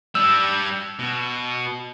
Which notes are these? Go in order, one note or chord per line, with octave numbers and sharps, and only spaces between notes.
G3 D4 E6
B2